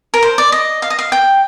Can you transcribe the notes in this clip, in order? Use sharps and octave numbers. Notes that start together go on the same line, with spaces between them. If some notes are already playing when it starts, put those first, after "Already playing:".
A#4
C5
D5
D#5
F5
D#5
F5
G5